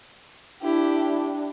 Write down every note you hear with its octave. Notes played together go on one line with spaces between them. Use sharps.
D4 E4 G4